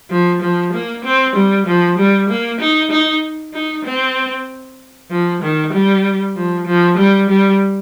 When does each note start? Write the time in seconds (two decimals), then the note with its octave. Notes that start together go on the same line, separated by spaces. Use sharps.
0.10 F3
0.42 F3
0.73 A#3
1.05 C4
1.35 G3
1.67 F3
1.98 G3
2.29 A#3
2.60 D#4
2.91 D#4
3.54 D#4
3.85 C4
5.10 F3
5.42 D#3
5.73 G3
6.36 F3
6.67 F3
6.98 G3
7.29 G3